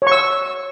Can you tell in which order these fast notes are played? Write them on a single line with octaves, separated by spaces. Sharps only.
C#5 C#6 E6